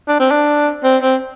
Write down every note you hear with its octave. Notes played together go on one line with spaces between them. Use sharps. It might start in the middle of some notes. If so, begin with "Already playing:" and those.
D4
C4
D4
C4
C4